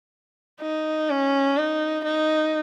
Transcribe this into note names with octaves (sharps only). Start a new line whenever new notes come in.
D#4
C#4
D#4
D#4